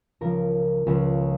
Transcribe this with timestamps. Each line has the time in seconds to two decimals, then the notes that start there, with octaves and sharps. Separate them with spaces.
0.21 C#2 C#3 F3 A#4
0.87 C#2 C#3 F3